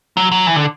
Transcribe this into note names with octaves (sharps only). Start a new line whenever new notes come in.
F#3
F#3
E3
D3